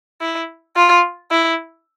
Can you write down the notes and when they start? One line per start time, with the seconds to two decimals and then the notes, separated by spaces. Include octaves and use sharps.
0.21 E4
0.76 F4
1.31 E4